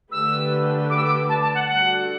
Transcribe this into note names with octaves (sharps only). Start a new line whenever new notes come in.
D3 A3 D4 G4 B4 E6
D6
E6
D6
A5
A5
F#5
G3 D4 F#4 A4 F#5